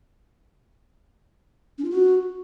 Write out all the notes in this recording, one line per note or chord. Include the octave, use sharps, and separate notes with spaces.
C#4
F4
F#4